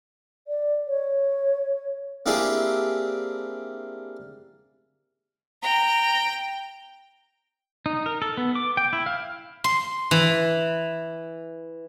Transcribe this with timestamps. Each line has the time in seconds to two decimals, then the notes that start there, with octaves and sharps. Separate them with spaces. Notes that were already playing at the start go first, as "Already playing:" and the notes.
0.47 D5
0.87 C#5
2.26 A#3 C4 D4 E4 G4 G#4
5.62 G5 A#5
7.86 D#4
8.06 A#4
8.22 A4
8.37 B3
8.56 D6
8.77 G5
8.93 E4
9.06 F5
9.64 C6
10.11 E3